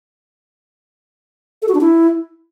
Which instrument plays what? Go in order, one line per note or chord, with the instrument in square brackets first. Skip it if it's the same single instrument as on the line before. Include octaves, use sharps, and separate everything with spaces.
[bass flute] A4
F#4
D4
E4